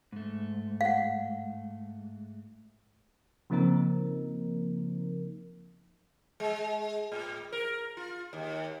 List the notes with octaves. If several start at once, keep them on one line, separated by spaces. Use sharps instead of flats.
G#2 A3
F5 F#5
C#3 F3 A#3 C4 D#4 A#4
G#3
A2
A#4
F4
D#2